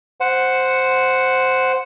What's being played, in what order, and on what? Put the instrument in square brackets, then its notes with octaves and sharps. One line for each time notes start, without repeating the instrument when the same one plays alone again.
[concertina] C5 F#5